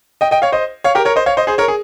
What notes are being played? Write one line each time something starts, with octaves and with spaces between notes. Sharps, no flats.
D#5 G5
D#5 G5
C#5 F5
C5 D#5
C#5 F5
G4 A#4
A#4 C#5
C5 D#5
C#5 F5
C5 D#5
G#4 C5
A#4 C#5
G#4